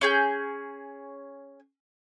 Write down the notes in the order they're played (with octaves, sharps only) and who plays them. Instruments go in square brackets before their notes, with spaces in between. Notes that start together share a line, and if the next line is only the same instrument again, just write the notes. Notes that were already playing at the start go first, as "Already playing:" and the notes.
[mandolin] C#4 G#4 G6